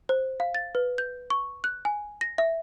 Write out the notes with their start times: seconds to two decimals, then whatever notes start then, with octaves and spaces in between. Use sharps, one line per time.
0.09 C5
0.40 F5
0.55 A6
0.75 B4
0.98 G6
1.30 C#6
1.64 F#6
1.85 G#5
2.21 A#6
2.38 E5